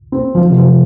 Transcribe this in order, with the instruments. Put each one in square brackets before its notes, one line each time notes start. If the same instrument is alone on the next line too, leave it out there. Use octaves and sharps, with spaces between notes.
[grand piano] C4
[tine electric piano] D#3 [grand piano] F3
[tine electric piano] C3
[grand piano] F3
[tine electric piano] C3